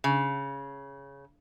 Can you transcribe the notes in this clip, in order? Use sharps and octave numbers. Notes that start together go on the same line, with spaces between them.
C#3